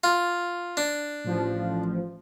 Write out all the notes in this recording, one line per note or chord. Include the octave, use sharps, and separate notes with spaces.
F4
D4
A1 F3